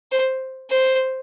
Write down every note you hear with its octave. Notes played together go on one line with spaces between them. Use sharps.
C5
C5